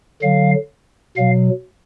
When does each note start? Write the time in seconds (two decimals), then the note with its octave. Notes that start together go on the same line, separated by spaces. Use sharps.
0.22 D3 F#3 F5
1.16 B2 F#3 F5